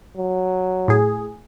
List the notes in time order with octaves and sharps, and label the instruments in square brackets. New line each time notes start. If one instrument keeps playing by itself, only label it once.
[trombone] F#3
[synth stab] A2 G#4